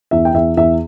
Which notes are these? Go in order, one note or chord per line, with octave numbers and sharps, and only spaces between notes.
E2 E5
G5
E2 E5
E2 E5